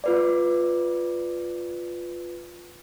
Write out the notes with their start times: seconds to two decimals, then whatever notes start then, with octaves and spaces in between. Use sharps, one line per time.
0.04 F4 B4 D5